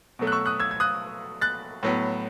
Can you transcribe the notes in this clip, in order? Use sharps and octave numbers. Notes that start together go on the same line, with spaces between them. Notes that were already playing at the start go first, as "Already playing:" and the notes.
B2 F#3 A3
F#6
C#6 E6
D#6 F#6
E6 G#6
G#6
D#6 F#6
F#6 A6
A2 F#3 B3